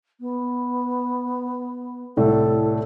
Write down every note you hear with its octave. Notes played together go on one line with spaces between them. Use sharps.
B3
C2 A2 A4 D5